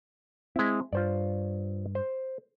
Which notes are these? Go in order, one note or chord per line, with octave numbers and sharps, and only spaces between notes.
G#3 C4 E4
G2 F4 C5 D5
C5